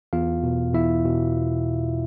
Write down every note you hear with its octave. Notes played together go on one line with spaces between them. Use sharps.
E2 F4 F5
B2
E2 E4 E5
B2